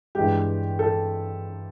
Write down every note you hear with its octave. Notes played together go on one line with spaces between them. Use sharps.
G2 E3 G#3 G4
A4